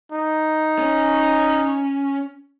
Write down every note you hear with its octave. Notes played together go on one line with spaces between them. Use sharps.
D#4
C#4